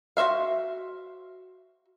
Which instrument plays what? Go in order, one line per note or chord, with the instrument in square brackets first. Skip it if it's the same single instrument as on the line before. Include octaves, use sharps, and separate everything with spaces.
[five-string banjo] F#4 C5 E5 F5